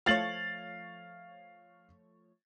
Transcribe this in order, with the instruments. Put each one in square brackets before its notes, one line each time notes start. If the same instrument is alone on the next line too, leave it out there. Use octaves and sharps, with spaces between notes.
[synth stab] F3 A3 C#5 [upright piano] F5 A6 F#7